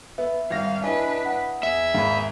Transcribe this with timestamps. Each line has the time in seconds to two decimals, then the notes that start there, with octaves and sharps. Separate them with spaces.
0.18 B3 E5
0.50 G#1 G3 F5 A#6
0.84 D4 E4 B4 D#5 G#5
1.26 F#5
1.63 E2 G#4 E5
1.94 G#1 G#2 F5 B5